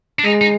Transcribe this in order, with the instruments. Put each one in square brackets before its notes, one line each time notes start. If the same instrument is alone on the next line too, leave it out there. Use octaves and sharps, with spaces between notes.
[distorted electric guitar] D4
[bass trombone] G#3 [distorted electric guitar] D#4
[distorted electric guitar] D#4